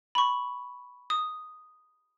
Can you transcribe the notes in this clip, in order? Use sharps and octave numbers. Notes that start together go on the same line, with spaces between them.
B5 C#6
D#6